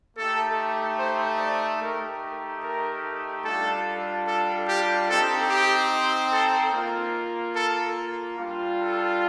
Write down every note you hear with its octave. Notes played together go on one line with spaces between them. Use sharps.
A3 D#4 G4 A4
C5
D5
A3 D#4 G4 A#4
A#4
G3 D4 F4 A4
A4
G4
C4 D#4 G4 A4
G4
A4
A#3 F4
A4
G3 D4 F4
A4